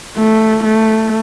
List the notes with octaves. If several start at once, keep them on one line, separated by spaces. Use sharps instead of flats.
A3
A3